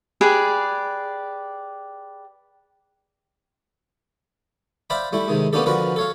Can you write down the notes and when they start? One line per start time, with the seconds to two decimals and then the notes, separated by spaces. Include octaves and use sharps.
0.21 G4 G#4 B4 D5
4.90 C5 D5 E5 F5 G5 B5
5.13 G3 A3 E4
5.28 C3 D#3 G#3
5.53 A#3 B3 C#4 D4 G4 A4
5.66 D3 F3 F#4 A#4 B4
5.96 A4 C#5 F5